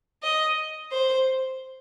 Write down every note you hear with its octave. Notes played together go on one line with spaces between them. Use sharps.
D#5
C5